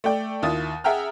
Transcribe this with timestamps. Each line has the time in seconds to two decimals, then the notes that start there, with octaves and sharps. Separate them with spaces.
0.04 A3 D5 G5
0.43 D#2 E4 F4 D#6 A6
0.84 G#4 E5 F#5 G5 A#5 F6